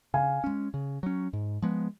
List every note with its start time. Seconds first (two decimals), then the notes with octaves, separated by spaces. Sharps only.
0.14 C#3 F5 G#5
0.44 G#3 C#4
0.74 C#3
1.03 F#3 C#4
1.33 G#2
1.62 F3 G#3 B3